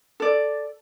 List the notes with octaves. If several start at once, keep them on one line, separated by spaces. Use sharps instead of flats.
A4 D5